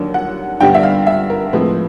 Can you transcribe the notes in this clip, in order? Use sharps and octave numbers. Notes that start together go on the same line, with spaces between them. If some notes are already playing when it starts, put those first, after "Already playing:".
Already playing: D#2 D3 F#3 A#3 D4
F#5
G2 D3 G3 B3 D4 G5
E5
F5
E5
A#4
A2 F3 G#3 C4 B4